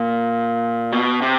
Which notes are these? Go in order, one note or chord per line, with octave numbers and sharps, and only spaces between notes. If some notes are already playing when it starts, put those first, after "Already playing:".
Already playing: A#2
B2
C3